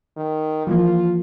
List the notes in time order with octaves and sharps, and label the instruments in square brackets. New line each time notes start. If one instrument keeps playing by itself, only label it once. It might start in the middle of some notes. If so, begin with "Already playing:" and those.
[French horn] D#3
[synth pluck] E3 F3 A#3 [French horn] F4